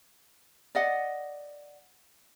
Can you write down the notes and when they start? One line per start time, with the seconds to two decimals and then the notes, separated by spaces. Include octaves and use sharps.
0.75 D5 D#5 F#5